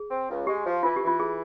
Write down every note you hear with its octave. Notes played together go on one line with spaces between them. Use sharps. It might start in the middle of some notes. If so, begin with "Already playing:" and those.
Already playing: G#4
C4
C#2
G#3 G4
F3
E3 F4
G4
E3 F4
G#4